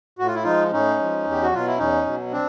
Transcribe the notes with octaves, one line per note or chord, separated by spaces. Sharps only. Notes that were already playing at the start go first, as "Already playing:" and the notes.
A2 F#4
F4
E4
F3 G#3 D#4 F4
A2 C#4 D#4
F3 G#3
E2
G4
F#4
B2 F#3 F4
E4
E2 C#4 D#4
B2 F#3
C4 D4